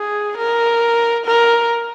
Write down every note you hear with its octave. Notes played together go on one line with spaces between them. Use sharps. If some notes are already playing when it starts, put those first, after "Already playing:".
Already playing: G#4
A#4
A#4